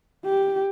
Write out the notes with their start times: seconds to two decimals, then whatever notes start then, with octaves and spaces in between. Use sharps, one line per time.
0.25 G4